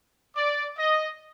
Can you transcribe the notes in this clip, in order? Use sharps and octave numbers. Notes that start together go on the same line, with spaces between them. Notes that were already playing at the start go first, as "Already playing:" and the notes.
D5
D#5